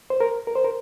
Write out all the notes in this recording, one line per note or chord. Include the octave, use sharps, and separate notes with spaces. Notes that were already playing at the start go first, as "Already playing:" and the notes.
C5
A#4
A#4
C5
A#4